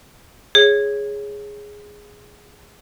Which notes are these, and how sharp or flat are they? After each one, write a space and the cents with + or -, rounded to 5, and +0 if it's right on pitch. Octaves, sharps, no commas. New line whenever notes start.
G#4 -5 C#5 +0